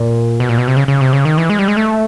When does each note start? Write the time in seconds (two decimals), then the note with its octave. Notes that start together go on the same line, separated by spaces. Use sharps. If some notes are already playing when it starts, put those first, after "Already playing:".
Already playing: A#2
0.40 B2
0.49 A#2
0.58 B2
0.68 C3
0.77 C#3
0.88 C#3
1.01 C3
1.13 C#3
1.25 D#3
1.38 E3
1.50 G#3
1.59 G3
1.68 G#3
1.77 A3